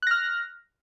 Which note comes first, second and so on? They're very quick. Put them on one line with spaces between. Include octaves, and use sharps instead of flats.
F#6 A#6 F6